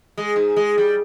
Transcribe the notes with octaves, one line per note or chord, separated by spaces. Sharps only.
G#3
G#2
G#3
G3